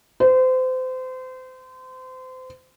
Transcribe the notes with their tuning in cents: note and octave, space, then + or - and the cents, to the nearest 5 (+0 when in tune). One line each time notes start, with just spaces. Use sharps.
C5 -30